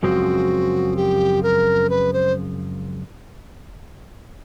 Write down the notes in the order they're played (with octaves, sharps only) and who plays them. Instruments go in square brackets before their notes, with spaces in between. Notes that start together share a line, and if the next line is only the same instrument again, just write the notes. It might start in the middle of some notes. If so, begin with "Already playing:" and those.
[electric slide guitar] F#2 C#3 F3 G#3 C4 [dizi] F#4
[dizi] G4
A#4
B4
C5